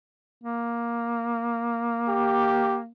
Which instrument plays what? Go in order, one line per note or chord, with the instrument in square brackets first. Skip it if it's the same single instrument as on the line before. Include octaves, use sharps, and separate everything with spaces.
[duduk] A#3
[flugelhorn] G4